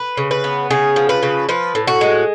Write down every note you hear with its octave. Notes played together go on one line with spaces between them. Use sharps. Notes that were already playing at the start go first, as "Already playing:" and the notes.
Already playing: B4
C#3
B4
B3
C#3 G#4
F3
B4
C#3
F3 B4
A2
F#4
G#3